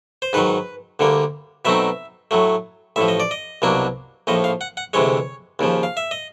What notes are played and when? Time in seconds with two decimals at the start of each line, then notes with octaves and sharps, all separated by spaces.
0.22 C5
0.33 G#2 D#3 F#3 B4
0.99 D2 D3 G3 A#3
1.65 B2 F#3 A3 C4 D#4 E5
2.31 A2 F#3 A3
2.96 A1 A2 F3 E5
3.08 D#5
3.20 D5
3.31 D#5
3.62 C2 B2 F#3 A#3 D4
4.27 A#1 A2 F3 D#5
4.44 F5
4.61 F#5
4.77 F#5
4.93 D2 C3 E3 G#3 C#5
5.59 D#2 C#3 F3
5.83 F5
5.97 E5
6.11 D#5